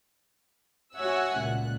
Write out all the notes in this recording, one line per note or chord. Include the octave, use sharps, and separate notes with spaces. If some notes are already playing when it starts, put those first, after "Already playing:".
F#4 C#5 E5 F#5 G#5 E6
C#2 A#2 F#6